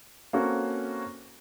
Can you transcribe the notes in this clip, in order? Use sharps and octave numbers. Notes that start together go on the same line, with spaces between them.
A#3 C4 C#4 F#4 A4